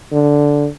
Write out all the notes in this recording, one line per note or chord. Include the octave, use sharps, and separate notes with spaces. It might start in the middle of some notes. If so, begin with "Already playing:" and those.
D3